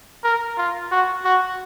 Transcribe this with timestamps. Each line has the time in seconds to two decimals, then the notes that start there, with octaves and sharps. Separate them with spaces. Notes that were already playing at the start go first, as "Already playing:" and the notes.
0.24 A#4
0.57 F4
0.91 F#4
1.25 F#4